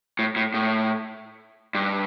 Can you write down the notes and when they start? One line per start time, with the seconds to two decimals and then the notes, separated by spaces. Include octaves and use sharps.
0.19 A2
0.36 A2
0.54 A2
1.75 G2